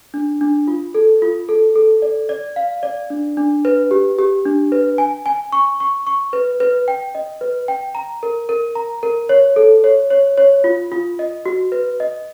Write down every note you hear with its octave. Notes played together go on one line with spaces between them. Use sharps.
D4
D4
F4
A4
F4
A4
A4
D5
D5
F5
D5
D4
D4
B4
G4
G4
D4
B4
G#5
G#5
C#6
C#6
C#6
B4
B4
G5
D#5
B4
G5
A#5
A#4
A#4
A#5
A#4
C#5
A4
C#5
C#5
C#5
F4
F4
D#5
F#4
B4
D#5